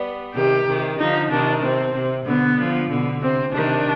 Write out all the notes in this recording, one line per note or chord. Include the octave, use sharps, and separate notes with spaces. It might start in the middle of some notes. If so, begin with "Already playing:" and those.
Already playing: G3 B3
C3 D#3 G4
C3 D#3
D3 F3 D#4
C3 D#3 D4
C3 C4
C3
B2 D3 B3
D3 F3
B2 D3
C3 C4
C3 D#3 D4